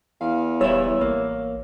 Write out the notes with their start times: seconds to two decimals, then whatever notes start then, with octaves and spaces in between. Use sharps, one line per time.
0.21 E2 F5
0.61 D#1 G3 E4 C#5 E6
1.01 A1 A#3